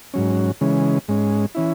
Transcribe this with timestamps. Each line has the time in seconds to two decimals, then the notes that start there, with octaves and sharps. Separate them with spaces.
0.14 G#2 F#3 C#4
0.61 C#3 E3 G#3 C#4
1.08 G#2 G#3 C#4
1.55 E3 C#4 E4